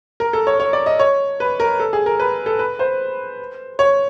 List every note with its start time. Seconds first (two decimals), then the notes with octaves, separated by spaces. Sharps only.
0.20 A#4
0.33 A4
0.47 C#5
0.60 C#5
0.73 D5
0.86 D#5
0.99 C#5
1.40 B4
1.60 A#4
1.79 A4
1.93 G#4
2.06 A#4
2.19 B4
2.46 A4
2.59 B4
2.79 C5
3.79 C#5